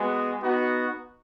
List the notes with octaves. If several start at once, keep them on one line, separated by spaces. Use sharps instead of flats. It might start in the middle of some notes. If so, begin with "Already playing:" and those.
Already playing: G#3 B3 F#4
B3 D#4 F#4